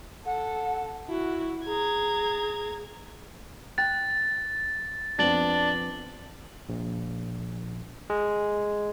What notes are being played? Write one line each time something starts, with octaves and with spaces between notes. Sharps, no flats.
A4 F#5
E4 F#4
G#4 A#5 G#6
G5 F#6 A6
F2 B3 C4 D4 A6 F#7
A#1
G#3